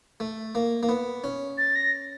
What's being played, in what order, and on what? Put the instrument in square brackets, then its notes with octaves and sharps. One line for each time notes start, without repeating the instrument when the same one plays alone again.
[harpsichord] A3
A#3
A#3
B3
C#4
[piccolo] A6
A#6